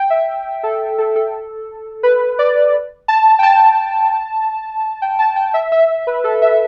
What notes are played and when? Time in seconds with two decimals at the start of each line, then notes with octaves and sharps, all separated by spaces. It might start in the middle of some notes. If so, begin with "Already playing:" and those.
Already playing: G5
0.10 E5
0.63 A4
0.98 A4
1.16 A4
2.03 B4
2.39 D5
3.08 A5
3.39 G5
3.43 A5
5.02 G5
5.19 A5
5.36 G5
5.54 E5
5.72 E5
6.07 B4
6.24 A4
6.42 E5